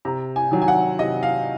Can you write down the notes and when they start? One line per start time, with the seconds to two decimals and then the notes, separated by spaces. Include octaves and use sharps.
0.05 C3 A#5
0.36 G#5
0.51 D#3 F#3
0.62 G#5
0.68 F#5
0.99 C3 D#5
1.23 F5